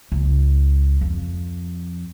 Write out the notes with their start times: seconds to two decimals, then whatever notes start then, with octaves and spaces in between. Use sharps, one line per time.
0.12 C#2
1.01 F2